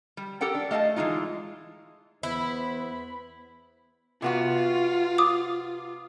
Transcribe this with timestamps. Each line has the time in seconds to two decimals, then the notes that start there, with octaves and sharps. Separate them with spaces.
0.17 G3
0.41 G4 A4 A#4 F#5 G5
0.55 D4
0.71 A3 D#5 F5 F#5 A5
0.96 E3 F3 G#3 D#4 F4
2.23 E2 B3 E4 C5 B5
4.22 C3 B3 F4 F#4
5.18 D6 D#6